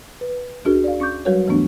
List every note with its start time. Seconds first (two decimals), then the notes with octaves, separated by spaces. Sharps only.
0.21 B4
0.65 D2 D4 F#4 G#4 A#4
0.84 D5 F5
1.00 C#4 C#6 D6 G6
1.25 F#3 G3 F#4 A#4 B4 C#5
1.46 E2 G#2 E3 A3 B3 D4